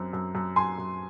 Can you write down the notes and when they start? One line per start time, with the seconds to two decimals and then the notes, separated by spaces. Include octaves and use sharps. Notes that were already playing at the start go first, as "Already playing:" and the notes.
Already playing: F#2 C4
0.13 F#2
0.35 F#2
0.56 F#2 G#5 C6
0.78 F#2